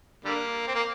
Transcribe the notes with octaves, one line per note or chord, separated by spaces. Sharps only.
D3 G3 A#3
C4
A#3